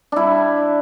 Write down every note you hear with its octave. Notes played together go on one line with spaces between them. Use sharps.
G3 D4 E4